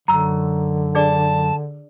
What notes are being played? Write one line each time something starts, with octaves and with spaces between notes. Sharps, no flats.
F#2 D3 A#5 E6
D4 G#4 D5 A5